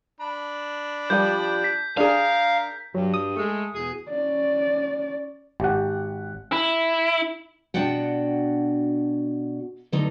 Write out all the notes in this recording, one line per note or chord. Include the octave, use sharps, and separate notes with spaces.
D4 B5
F3 G3 G6
B6
D4 G#4 A#4 F5
G2 F#3
D#6
G#3 A3
E2 B2 G#4
C#4 D5
G#1 G4 F#5
E4
B2 D4 F#4 D5 F#5 G5
D3 F#3 A3 B3 D#4